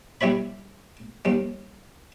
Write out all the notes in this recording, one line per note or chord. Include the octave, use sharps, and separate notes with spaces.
G3 E4 C#5 B5
D#2 G3